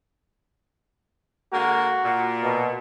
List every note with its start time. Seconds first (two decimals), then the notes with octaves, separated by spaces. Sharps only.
1.53 D3 G#3 A#3 F#4
2.05 A#2
2.44 B2